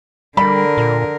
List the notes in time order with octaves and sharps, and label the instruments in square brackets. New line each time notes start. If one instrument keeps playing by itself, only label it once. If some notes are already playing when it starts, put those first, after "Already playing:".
[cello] D3 A#4 [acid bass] G3 [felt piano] B5
[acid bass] A#2